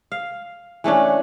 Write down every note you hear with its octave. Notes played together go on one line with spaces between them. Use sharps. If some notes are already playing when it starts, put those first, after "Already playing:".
F5
E3 A3 C#4 D4